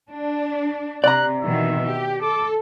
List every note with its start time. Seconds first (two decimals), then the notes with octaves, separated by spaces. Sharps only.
0.10 D4
1.04 C3 D5 A#5 F#6
1.41 B2 D#3 E3 E5
1.84 G4
2.22 A4 D6